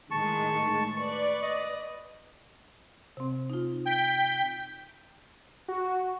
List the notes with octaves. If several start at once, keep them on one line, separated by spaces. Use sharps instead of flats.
A2 D#3 G#3 A5 C#6
B4 D5 C#6
D#5
C3 C4
D#4 F4
G5 G6 B6
F#4